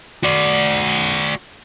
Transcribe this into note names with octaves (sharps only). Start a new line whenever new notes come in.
F#4 D5